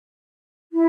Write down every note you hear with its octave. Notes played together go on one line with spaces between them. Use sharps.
E4